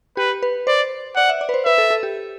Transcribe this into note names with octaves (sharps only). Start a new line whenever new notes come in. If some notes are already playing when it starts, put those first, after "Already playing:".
G4 B4
B4
C5 D5
D5 F#5
E5
D5
B4
C5
B4 E5
A4
A4
G4